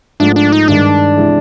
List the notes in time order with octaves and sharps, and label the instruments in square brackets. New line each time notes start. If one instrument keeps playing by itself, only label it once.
[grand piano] G#2 F3 A3 [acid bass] D4
[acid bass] D4
D#4
[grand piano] G2 D#3 G#3 [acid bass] D4
[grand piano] C3 E3 G#3